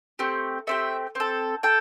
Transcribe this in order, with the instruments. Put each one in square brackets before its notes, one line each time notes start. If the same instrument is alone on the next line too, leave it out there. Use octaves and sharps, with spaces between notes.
[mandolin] A3 C4 G4
A3 C4 G4 E5
C4 A4
A4 G5